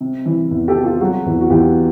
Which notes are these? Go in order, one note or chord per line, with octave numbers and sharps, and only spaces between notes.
C3
E3
E2
G4 A4
C3
F4 G4
F#3 F#4 G#4
E2
F#4
E2 F4 G4